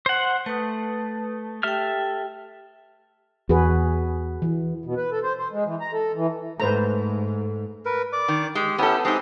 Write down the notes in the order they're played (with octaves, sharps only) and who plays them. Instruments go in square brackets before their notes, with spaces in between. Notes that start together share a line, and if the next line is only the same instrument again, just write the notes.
[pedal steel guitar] C5 F#5
[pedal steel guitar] A3 [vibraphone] B4 D#6
[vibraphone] G4 G5 [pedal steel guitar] A4 E5 F6
[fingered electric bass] E2 [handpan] F#4 G#4 B4
[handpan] E3
[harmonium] B2
B4
A4
C5
C5
G#3
E3
A#5
A4
E3
[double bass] G#2 [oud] A3 [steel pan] B4 C5 A#5
[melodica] A#4 B4
D5 D6
[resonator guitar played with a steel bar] D#3
[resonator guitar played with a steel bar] G#3 [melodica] G4
[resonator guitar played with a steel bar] B3 A4 [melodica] C#4 E4 G4
[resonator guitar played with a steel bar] G#3 D#4 [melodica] C4 G4 G#4